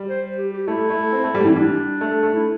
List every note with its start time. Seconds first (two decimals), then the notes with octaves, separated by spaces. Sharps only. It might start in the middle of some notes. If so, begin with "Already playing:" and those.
Already playing: G3
0.08 C5
0.38 G4
0.53 G4
0.67 A3 E4
0.90 A3
1.12 C4
1.23 A3
1.34 G3
1.45 E3 C4
1.56 G3 D4
2.01 A3
2.23 A3
2.34 E4